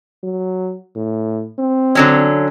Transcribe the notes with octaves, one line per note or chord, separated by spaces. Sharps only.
F#3
A2
C4
D3 F#3 C#4